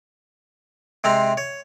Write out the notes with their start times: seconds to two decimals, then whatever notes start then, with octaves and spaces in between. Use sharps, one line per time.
1.04 C3 G#3 C4 A#5
1.37 C#5